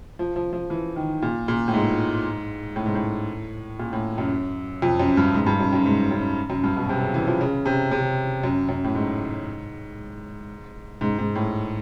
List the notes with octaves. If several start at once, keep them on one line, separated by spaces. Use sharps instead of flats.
F3
F3
F3
E3
D#3
A#2
A#2
A2
G#2
A2
G#2
A2
A#2
A2
F#2
F2
F#2
G2
G#2
G2
F#2
F#2
G#2
F#2
F#2
G2
B2
C3
C#3
E3
F3
C#3
C3
C3
F#2
F#2
A2
G#2
G#2
G#2
A2